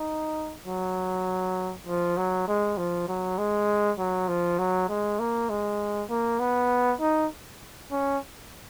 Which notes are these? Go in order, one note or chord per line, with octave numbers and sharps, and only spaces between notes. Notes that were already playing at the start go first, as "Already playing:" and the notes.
Already playing: D#4
F#3
F3
F#3
G#3
F3
F#3
G#3
F#3
F3
F#3
G#3
A#3
G#3
A#3
B3
D#4
C#4